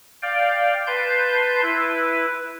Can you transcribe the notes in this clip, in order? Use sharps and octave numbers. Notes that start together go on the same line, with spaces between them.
D5 F5 G5
B4 A5 C6 G6
E4 B4